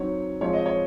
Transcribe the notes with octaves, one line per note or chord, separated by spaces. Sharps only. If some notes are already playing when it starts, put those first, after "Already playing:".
Already playing: F#3 C4 D#4 C#5
F3 G#3 C4 F4 C#5
D#5
C#5